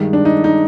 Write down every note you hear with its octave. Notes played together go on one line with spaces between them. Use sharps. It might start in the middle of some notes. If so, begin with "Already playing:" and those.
Already playing: G2 D#3 G#3
D4
D#4
D#4